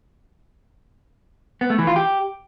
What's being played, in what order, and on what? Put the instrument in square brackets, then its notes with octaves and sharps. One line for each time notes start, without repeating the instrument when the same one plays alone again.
[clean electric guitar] B3
A3
E3
F4
G4